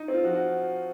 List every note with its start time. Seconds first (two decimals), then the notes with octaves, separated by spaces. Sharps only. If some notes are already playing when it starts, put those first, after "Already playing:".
Already playing: D#4
0.08 C4
0.14 F4
0.24 F3 F#4
0.34 F#4